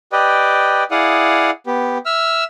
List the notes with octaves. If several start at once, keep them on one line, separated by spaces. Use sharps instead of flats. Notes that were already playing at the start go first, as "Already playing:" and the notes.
G4 B4 D5 D#5 G5
E4 G#4 D5 F5 F#5 D#6
B3 G4
E5 E6 F6